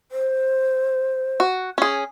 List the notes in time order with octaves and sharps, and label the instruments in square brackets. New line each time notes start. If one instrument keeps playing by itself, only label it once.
[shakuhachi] C5
[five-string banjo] F#4
C#4 G#4